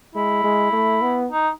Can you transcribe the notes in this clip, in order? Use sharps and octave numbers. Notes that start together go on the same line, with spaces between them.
G#3 E4
G#3
A3
B3
D#4